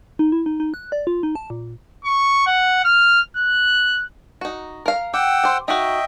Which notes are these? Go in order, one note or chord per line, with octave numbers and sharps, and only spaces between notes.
D#4
E4
D#4
D#4
F#6
D5
F4
D#4
A5
A#2
C#6
F#5
F6
F#6
D#4 F#4
A#4 F5
G4 F#5 G5 E6
G4 C5
D#4 F#4 D#5 E5 G5